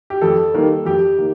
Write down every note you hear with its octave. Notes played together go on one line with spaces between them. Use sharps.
G4
F2 A4
D#3 G3 A#3
F2 G4
D#3 A#3